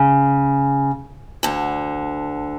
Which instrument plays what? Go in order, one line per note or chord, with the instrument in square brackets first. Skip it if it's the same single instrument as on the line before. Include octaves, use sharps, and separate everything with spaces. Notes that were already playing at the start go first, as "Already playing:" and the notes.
Already playing: [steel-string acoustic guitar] C#3
D2 D3